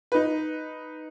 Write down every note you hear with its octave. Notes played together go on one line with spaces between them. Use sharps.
D#4 B4